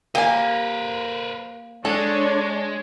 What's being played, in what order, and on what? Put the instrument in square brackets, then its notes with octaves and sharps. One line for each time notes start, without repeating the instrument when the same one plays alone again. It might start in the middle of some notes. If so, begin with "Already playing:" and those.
[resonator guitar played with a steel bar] A#3 [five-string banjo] G4 G#5 [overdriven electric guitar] A#4 B4
[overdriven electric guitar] G#3 [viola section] D4 C#5 [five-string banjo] A4